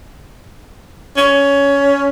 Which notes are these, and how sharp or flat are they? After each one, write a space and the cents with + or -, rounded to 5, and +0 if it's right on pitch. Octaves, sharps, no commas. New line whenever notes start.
C#4 +15